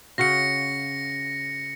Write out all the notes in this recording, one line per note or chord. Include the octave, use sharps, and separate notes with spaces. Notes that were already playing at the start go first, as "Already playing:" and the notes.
C#3 F#4 F5 A#6 C#7